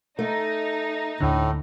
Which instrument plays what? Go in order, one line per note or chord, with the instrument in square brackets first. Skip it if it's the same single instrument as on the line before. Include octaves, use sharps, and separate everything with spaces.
[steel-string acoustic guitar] A3 [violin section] D#4
[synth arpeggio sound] D2 D3 [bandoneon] A2